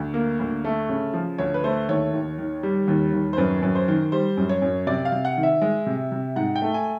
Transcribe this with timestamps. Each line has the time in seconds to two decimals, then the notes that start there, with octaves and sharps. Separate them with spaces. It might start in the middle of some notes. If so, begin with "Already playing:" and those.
Already playing: D2
0.14 A#3
0.40 D2
0.64 A3
0.89 C#3
1.14 F3
1.38 D2 C#5
1.54 B4
1.64 A3 C5
1.89 D#2 C#5
2.14 D#2
2.38 D#3
2.63 G3
2.87 D#2
3.13 D#2
3.33 C5
3.37 F#2 B4
3.62 F#2
3.75 C5
3.88 D#3
4.12 G3 C5
4.37 F#2
4.49 C#5
4.62 F#2
4.87 C3 D5
5.05 F5
5.12 C3
5.25 F#5
5.37 D#3
5.43 E5
5.62 G#3
5.86 C3
6.12 C3
6.36 G#2 F#5
6.56 G5
6.62 A3
6.74 G#5